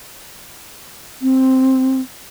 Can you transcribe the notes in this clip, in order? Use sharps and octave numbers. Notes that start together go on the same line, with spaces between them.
C4